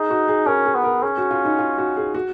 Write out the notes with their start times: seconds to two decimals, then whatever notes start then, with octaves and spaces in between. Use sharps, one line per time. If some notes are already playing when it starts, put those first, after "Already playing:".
Already playing: D#4 G#4
0.10 F#4
0.28 G#4
0.46 C#4 A#4
0.65 G#4
0.75 B3
0.84 A#4
1.02 C#4 G#4
1.18 F#4
1.31 F4
1.45 D#4
1.59 F4
1.78 F#4
1.97 G#4
2.15 F#4